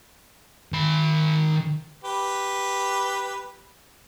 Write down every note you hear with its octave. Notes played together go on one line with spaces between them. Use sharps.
D#3 B5
G4 B4